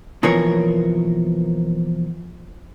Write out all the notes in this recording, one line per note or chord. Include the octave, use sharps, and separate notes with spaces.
B2 E3 F3 A#3 A#4 C#5